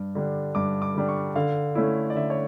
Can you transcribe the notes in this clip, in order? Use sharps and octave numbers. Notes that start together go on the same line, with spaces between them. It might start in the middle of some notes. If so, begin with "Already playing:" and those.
Already playing: G2
D3 G3 D4
G2 D6
D6
D3 G3 D4
C#6
D3 F5
A3 C#4 E4
D5
D3 E5
C#5